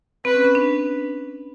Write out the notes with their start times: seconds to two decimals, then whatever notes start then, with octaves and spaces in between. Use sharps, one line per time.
0.25 C4 B4
0.34 C#4
0.45 C#4
0.55 D4